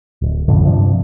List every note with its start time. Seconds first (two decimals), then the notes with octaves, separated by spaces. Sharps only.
0.22 D1
0.48 D1 A1 F2 D3
0.65 G2 C3 F3 D4